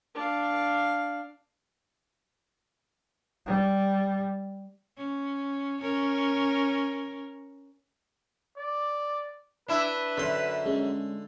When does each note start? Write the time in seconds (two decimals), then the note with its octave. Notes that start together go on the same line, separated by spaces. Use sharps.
0.15 D4 F5
3.46 G3
4.97 C#4
5.81 C#4 A#4
8.57 D5
9.68 D4 E4 B4
10.17 F#2 D3 C6
10.66 G#3 C#4